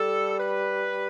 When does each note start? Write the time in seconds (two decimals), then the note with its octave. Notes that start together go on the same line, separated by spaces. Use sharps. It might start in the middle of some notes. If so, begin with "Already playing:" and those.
Already playing: G3 A4
0.40 B4